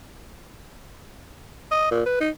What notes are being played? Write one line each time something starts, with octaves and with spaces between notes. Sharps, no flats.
D#5
A#2
B4
D#4